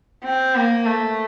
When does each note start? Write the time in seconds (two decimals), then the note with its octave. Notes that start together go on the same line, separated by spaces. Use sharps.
0.24 C4
0.56 A#3
0.86 A3